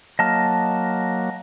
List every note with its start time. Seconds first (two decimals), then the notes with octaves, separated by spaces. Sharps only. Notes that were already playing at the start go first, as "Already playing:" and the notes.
0.19 F#3 A#3 D#5 A5 F6